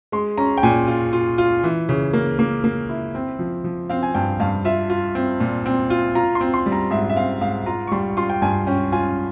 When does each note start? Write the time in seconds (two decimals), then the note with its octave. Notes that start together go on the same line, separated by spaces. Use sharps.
0.12 G#3 C6
0.38 C#4 A#5
0.57 G5
0.63 A#2 G#5
0.87 F4
1.13 F4
1.38 F4
1.64 E3
1.89 C#3
2.13 A#3
2.39 A#3
2.64 A#3
2.89 E4
3.15 C4
3.39 F3
3.64 F3
3.90 C4 F5
4.03 G#5
4.14 G2 G5
4.40 G2 F5
4.65 F4 E5
4.90 F4
5.15 C4
5.40 A#2
5.66 C4
5.90 F4
6.15 F4 A#5
6.35 C6
6.41 C4
6.54 C6
6.66 G3
6.72 A#5
6.91 G#2 E5
7.09 E5
7.16 C4 F5
7.41 G#2 F5
7.66 F4 A#5
7.87 C#6
7.92 G3 C6
8.17 F4 C6
8.29 G5
8.42 G2 G#5
8.67 C#4 G5
8.92 F4 G#5